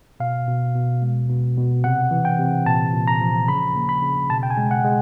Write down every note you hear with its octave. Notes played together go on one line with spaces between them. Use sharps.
B2 F5
B2
B2
G#3
B2
B2
C3 F#5
E3
G5
C3
A#2 A5
A#2
A#5
F3
C#3 B5
A#3
B5
C#3
B2 A5
G5
G#5
G#3
F#5
G#3